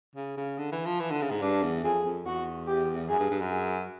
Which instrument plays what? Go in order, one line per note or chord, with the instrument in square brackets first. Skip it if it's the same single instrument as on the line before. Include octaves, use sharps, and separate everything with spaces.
[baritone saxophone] C#3
C#3
D3
E3
F3
E3
D3
C#3
G#2
[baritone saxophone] G2 [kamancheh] D4
[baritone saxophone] E2
[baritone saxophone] F2 [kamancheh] G#4
[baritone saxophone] F2
[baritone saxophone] E2 [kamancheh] F#4
[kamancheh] G4
[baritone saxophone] F#2 [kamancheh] G#4
[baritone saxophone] G2
G2
F#2
[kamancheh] G#4